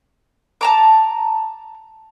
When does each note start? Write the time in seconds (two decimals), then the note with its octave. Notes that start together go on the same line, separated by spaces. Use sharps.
0.61 A5 A#5 D6